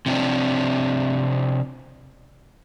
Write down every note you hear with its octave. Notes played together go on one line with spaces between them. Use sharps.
C3 F3 C4 D4